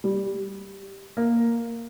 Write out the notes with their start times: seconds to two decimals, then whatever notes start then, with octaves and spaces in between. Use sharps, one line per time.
0.04 G3
1.17 A#3